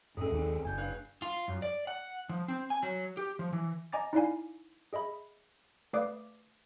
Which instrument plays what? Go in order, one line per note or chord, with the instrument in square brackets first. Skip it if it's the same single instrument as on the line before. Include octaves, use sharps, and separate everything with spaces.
[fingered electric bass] F#2 A2 C#4 [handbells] G#4 A4
[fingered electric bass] D#2 B3 C4
[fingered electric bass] F#1 [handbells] G#5 G6
[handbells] D4 B4 F5
[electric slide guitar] F4
F#2
D5
F#5
F3
C4
G#5
F#3
G4
F3
E3
[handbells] D#5 G#5 A#5 D6 A6
D#4 E4 D5 F5 G#5
G#4 D#5 E5 B5
A3 B4 D5 F5 D6 D#6